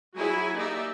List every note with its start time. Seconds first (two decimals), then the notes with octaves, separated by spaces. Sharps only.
0.16 F#3 E4 F#4 G#4 G#5
0.55 A#3 D#4 G4 D5 E5